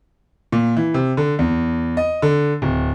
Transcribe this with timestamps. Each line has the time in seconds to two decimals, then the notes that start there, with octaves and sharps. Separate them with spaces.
0.52 A#2
0.77 E3
0.94 C3
1.17 D3
1.39 E2
1.97 D#5
2.22 D3
2.62 D1